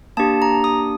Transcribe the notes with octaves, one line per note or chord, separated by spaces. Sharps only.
A#3 D4 G4 A5
A#5
D#6